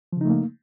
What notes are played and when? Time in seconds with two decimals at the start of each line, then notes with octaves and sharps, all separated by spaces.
0.13 F3
0.17 C#3
0.21 D#4
0.25 A3
0.29 A#3